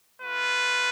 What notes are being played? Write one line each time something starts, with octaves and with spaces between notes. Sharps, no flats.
A3 F4 B4